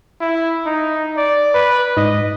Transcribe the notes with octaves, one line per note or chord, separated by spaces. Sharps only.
E4
D#4
D5
B4
G#2 D#5